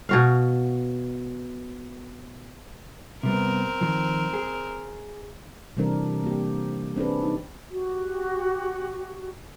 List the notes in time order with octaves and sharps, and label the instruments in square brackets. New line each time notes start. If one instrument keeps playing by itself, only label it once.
[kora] B2 F#4 F5
[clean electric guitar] C3 G3 B3 [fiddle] C4 A#4
[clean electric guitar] D#3 F3
G#4
[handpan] C3 E3 G3 C4 D4 A#4
A#3 G4
C4 D4 G#4 B4
D#4
[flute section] F#4 G4